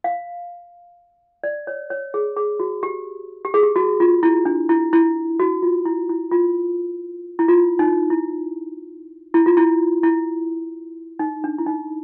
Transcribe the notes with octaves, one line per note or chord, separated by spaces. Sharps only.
F5
D5
C#5
C#5
G#4
G#4
F#4
G4
G4
G#4
G4
F#4
F4
E4
D4
E4
E4
F#4
F4
E4
E4
F4
E4
F4
D#4
E4
E4
F4
E4
E4
D#4
D4
E4
D#4